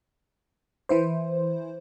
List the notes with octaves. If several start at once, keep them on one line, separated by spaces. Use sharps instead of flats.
E3 E4 C5